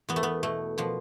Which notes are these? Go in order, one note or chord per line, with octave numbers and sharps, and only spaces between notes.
E2 B3
A3
B3
B2 A3
B2 F3